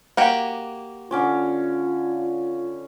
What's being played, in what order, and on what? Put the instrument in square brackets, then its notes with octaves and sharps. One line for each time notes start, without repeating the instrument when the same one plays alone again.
[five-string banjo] A#3 F#4 G4
[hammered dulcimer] D3 C#4 D6 [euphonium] F4